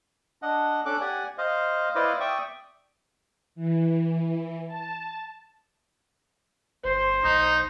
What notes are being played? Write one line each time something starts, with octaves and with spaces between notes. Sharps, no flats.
D4 D#5 F#5
C#4 D4 A4 D6 F#6
G4 D5 F#5 G#5
C5 D#5 F5
E4 B4 C5 D5 D#5 F5
D5 E5 G5 C#6 D#6
E3
A5
G1 C5
B1 D#4